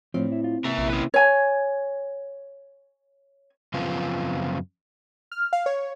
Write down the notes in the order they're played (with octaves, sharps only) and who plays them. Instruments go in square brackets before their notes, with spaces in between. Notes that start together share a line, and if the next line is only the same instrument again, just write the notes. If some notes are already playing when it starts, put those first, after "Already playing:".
[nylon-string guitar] A2 D4 [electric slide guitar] F3 [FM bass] C4
[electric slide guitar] E4
F4
[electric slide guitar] C3 A#3 [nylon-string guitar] E3 [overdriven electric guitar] A#4 E5
[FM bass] A#1
[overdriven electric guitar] C#4 B4
[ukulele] C#5 G#5
[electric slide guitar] F#2 C#3 F3 B3 C4 F4
[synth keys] F6
F5
C#5